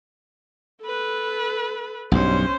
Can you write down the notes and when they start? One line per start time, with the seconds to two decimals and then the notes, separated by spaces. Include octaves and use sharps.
0.84 A4 B4
2.12 B1 G2 C#4 C5